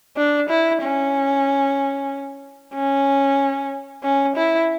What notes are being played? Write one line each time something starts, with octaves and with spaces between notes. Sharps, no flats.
D4
E4
C#4
C#4
C#4
E4